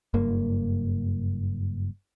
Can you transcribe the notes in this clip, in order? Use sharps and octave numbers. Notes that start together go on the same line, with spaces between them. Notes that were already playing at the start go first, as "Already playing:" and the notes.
F#1 G2 A#3